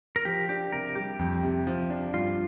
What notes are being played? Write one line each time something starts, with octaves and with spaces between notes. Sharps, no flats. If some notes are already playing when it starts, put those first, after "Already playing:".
A#4
F3 G4
D4 G4
C3 A#4
G3 G4
F2
C3
F3
D4
G2 F4